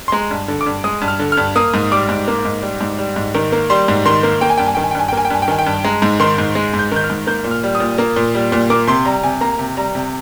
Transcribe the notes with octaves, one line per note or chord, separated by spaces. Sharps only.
C6
G#3 A#5
G2
D3
D6
G2
G#3 D#6
G2
F6
D3
F6
G2
A#3 D#6
G#2
G3 D6
G#2
A#3
G#2
G3
G#2
G3
G#2
D#3
A#3
G3 C6
G#2
D#3 C6
A#3
A#3 G5
G#5
G2 G5
G#5
D#3 G5
G#5
G5
G2 G#5
G5
A#3 G#5
G5
G2 G#5
G5
D#3 G#5
G5
G2
G#3 A#5
G#2
D#3 C6
G#2
G#3
G#2
G6
D#3 G6
F6
G#2
A#3 G6
A#2
F6
G3
D#6
A#2
A#3
A#2
G3
A#2
A#3 D6
C3 C6
G3 A#5
C3 G#5
A#3 A#5
C3
G3 A#5
C3